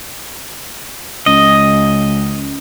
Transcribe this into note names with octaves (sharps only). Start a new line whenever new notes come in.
C#2 D#5